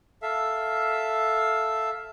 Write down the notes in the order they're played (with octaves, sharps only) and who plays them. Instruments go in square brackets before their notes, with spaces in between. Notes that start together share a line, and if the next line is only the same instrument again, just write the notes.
[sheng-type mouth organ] A4 E5 F5